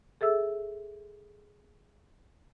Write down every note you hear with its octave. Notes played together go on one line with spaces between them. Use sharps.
G#4 A4 E5 E6